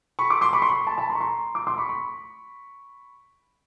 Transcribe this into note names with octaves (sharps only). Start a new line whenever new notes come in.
B5 C#6
C6 D6
C6 D6
B5 C#6
C6
B5 C#6
A5 B5
A5 B5
A#5 C6
C#6
A#5 C6
C6 D6
C6 D6
B5 C#6
B5 C#6